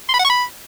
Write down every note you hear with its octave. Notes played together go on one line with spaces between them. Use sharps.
C6
B5
F#5
C#6
B5